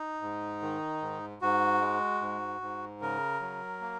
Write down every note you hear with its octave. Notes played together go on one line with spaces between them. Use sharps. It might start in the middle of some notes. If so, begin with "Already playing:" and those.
Already playing: D#4
G#2
D#3
G#2
G#2 F#4
G#3
G#2
G#2
C#3 A#4
F#3
A#3